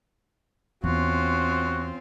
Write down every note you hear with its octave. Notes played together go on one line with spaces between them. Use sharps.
E2 C4 C#4 F4 F#4